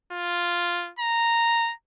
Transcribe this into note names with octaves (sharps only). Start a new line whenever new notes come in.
F4
A#5